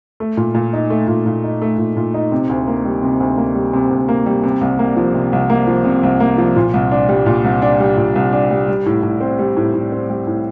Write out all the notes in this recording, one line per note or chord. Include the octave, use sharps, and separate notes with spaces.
A3
A#2
A#2
D#4
A3
A#2
A#2
D#4
A3
A#2
A#2
D#4
C3
D2
A#3
G3
C3
D2
A#3
G3
C3
D2
A#3
G3
C3
C2
A#3
F3
C3
C2
A#3
F3
C3
C2
A#3
F3
A#2
C2
D4
G3
A#2
C2
D4
G3
A#2
C2
D4
G3
G3
A2
A2
C4
G3
A2
A2
C4
G3
A2